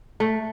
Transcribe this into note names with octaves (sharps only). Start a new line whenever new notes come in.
A3